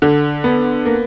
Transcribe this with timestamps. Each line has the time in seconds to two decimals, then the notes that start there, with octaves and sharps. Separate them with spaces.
0.02 D3
0.44 B3
0.86 A#3